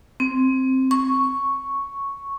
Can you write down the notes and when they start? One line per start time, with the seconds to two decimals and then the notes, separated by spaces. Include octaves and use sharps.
0.20 C4
0.91 C#6